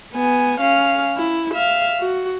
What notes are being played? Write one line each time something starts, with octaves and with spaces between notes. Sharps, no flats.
B3 G#5
C#4 F5
E4
E5 F5
F#4